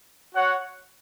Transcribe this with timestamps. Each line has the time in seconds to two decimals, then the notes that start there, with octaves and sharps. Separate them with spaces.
0.35 F#4 C#5 F#5